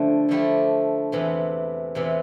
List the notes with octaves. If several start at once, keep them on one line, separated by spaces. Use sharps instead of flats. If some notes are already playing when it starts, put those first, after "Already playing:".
Already playing: D3 F3 A3 E4 G4
D3 F3 A3 E4 G4
E2 C3 E3
E2 C3 E3